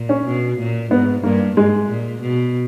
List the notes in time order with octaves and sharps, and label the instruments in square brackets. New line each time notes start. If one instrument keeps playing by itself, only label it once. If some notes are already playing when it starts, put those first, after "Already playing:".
Already playing: [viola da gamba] A#2
[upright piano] C#4
[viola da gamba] B2
A#2
[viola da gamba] G#2 [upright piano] B3
[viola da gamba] G2 [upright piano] A#3
[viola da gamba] G#2 [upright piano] G#3
[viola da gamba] A#2
B2